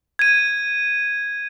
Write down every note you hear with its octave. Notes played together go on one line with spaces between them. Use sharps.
G#6 D#7